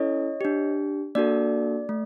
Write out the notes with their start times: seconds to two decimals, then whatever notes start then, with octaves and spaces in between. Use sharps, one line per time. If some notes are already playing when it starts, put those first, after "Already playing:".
Already playing: C#4 E4 A4 C#5 D#5
0.41 D4 G4
1.15 A#3 D4 F#4 A4 D5
1.89 A3